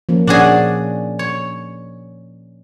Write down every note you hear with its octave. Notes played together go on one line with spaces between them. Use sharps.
F3 A#3 C#4
A#2 C#4 D4 F#4 G#4 D5
C#5